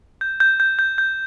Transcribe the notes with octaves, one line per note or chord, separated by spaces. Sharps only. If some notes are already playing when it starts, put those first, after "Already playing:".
G6
G6
G6
G6
G6